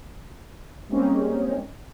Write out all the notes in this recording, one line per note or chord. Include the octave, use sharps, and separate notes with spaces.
G3 G#3 A#3 C4 C#4 D#4